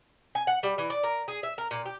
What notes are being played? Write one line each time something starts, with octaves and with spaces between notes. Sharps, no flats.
G#5
F#5
G3
E3
D5
A#4
G#4
E5
A#4
A#2
G4